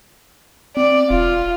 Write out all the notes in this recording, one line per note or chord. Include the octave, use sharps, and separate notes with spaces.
C4 D5
E1 F4